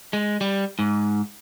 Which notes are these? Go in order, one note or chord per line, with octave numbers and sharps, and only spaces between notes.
G#3
G3
G#2